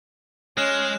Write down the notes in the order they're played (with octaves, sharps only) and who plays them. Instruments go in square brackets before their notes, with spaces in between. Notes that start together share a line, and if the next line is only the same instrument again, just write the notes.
[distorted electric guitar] G#3 [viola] C#4 [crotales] F6 F#6 E7